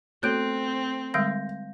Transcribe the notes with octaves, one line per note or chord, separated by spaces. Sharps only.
A3 B3 C4 F#4 C#5 F#6 G6 D7
D3 G3 G#3 F5 G6 A#6